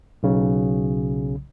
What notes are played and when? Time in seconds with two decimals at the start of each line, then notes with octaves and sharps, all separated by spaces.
0.23 B1 C#3 F#3